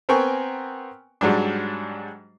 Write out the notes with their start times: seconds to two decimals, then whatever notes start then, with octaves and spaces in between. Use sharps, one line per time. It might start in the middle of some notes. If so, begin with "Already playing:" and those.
0.09 B3 C4 A#4 G5 G#5 C#6
1.21 G#2 F#3 G3 D4